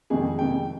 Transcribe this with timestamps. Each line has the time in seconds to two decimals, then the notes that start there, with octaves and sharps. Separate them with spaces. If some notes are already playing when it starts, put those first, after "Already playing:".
0.10 F2 C3 D#3 G#3 G#4
0.39 F2 C3 D#3 G#3 G5